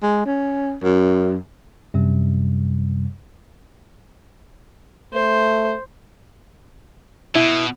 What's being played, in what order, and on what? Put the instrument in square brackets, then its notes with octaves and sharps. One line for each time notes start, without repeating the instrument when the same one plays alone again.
[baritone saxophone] G#3
C#4
F#2
[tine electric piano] F#2 C3 G3
[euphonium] A3 [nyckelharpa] C5
[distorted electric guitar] B2 [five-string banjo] E4